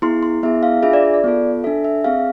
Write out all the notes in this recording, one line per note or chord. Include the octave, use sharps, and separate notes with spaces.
B3 E4 G#4 C6
C6
B3 E4 G#4 E5
F5
D4 F4 G#4 E5
D5
D5
D5
B3 F4 A4
D4 A4 E5
E5
C4 G#4 F5